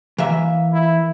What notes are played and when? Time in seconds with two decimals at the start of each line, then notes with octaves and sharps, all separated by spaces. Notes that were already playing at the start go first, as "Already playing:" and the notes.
0.18 E3 A#3 E5
0.73 E4